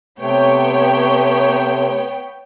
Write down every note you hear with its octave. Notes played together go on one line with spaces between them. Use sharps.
C3 A3 B3 C#5 G5